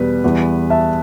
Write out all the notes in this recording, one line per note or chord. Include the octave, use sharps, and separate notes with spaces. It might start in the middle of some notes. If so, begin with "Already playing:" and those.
Already playing: E2 B2 G3 B4
E2 E3 G3
E5 A5